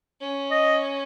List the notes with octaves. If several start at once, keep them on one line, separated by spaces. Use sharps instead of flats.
C#4
D#5